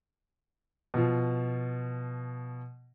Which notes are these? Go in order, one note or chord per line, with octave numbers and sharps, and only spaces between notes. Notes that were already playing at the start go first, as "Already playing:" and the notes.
B2 F3